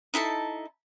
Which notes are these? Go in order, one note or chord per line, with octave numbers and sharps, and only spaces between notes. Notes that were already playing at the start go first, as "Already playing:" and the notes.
D#4 E4 A4 A5